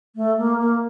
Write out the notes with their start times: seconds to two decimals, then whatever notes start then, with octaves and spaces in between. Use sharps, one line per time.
0.16 A3
0.38 A#3
0.60 A#3